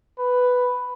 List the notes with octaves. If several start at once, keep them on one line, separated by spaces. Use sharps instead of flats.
B4